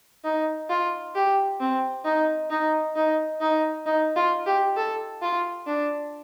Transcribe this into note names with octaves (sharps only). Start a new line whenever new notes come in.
D#4
F4
G4
C4
D#4
D#4
D#4
D#4
D#4
F4
G4
A4
F4
D4